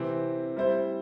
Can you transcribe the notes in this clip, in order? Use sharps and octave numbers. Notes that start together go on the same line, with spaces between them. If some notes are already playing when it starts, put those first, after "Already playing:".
Already playing: C3 E3 C4
G3 E4 C5